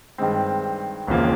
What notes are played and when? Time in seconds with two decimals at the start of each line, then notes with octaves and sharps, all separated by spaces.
0.18 G2 D#3 G#3 C4
1.07 E1 D#2 C#3 F3 A#3